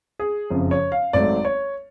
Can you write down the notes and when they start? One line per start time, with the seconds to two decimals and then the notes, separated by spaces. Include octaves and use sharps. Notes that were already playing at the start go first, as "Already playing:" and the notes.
0.20 G#4
0.50 F#1 F2 C#3 F3
0.71 C#5
0.92 F5
1.13 G#1 G#2 F#3 A3 D5
1.45 C#5